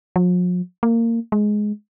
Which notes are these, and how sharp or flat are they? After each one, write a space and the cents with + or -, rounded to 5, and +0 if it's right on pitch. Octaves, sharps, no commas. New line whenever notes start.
F3 +45
A#3 -20
G#3 +10